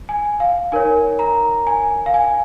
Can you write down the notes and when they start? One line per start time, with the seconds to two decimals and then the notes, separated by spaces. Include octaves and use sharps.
0.09 G#5
0.40 F5
0.72 D#4 A#4 C#5 G#5
1.19 A#5
1.67 G#5
2.06 F5
2.14 G#5